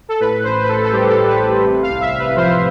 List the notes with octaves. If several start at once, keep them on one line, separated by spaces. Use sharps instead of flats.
A4
A2 B4
A1 C5
B4
A1 A4
A4
G3 G4
G4
A4
A2
B4
A1
C3
F5
C2
E5
C2
B4
F3 C5